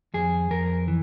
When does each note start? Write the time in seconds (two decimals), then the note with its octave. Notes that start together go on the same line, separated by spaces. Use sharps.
0.14 F2 G#4
0.50 F2 A#4
0.88 E3